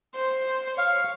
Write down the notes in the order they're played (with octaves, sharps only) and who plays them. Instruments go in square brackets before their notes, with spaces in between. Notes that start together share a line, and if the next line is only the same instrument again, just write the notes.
[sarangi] C5
[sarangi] C#5 [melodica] F5